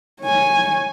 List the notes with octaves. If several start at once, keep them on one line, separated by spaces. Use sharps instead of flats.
C#5 G#5